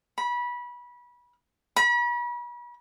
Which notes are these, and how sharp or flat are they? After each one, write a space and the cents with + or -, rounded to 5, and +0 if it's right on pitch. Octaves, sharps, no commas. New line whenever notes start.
B5 -25
B5 -40